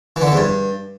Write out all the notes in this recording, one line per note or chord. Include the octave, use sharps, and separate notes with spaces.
E3
D3
E3
E2
G2